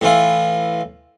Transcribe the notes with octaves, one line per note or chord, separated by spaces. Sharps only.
A2 E3 F4